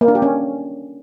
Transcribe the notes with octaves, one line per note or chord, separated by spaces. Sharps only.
A#3
D4
G4
C#4